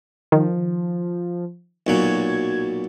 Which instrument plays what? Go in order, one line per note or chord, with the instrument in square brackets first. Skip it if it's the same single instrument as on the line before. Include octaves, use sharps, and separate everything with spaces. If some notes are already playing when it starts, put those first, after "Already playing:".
[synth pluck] D#3 [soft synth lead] F3
[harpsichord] B1 A#2 F#3 [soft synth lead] G#6